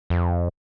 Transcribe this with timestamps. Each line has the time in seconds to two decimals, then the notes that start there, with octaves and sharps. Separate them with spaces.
0.10 F2